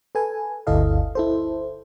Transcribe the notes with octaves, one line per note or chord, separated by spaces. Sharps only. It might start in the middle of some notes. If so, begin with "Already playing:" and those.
A4 B4 G#5
G1 D2 E4 A4 D#5 F5
E4 A4 C5